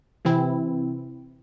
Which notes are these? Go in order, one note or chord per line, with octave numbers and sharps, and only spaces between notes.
C3 E3 C4 E4